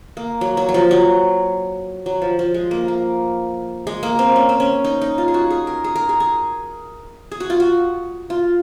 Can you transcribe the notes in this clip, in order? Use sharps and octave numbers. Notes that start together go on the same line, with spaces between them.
A#3
F#3
F#3
F#3
F3
F#3
F#3
F3
F3
G#3
A#3
A#3
G#3
A#3
C4
C#4
C4
C#4
D#4
D#4
F4
G#4
F#4
G#4
A#4
G#4
A#4
G#4
G#4
G#4
F#4
F4
F#4
F4